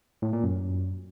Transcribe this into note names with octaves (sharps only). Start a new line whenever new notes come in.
A2
A#2
F#2